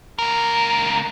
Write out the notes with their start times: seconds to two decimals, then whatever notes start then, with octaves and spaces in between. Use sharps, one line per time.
0.19 C#2 A#4